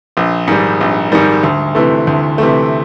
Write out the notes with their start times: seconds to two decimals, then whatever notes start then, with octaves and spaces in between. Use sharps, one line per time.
0.17 A#1
0.48 G#2 D#3 G3
0.81 A#1
1.12 G#2 D#3 G3
1.44 D2
1.75 C3 E3 A3
2.07 D2
2.38 C3 E3 A3